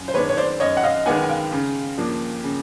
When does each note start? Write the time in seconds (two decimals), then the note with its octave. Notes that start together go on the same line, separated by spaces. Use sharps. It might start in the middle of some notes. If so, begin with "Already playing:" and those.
Already playing: F#2
0.08 C5
0.14 D#3 G#3 B3 D4 B4 C#5
0.29 C#5
0.37 C5 D5
0.60 F#2 C#5 D#5
0.77 F#5
0.83 D#5 F5
1.06 D#3 G#3 B3 D4 F#5 G#5
1.22 G#5
1.29 F5 G5
1.52 C#3
1.98 F3 A#3 D4
2.43 C#3